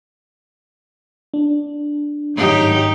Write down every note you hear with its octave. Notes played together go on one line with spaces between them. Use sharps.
D4
G#1 F#3 D#4 G4